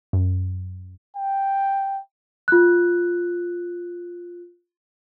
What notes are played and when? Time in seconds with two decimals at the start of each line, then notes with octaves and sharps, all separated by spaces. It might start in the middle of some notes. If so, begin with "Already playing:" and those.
0.13 F#2
1.17 G5
2.48 F4 F#6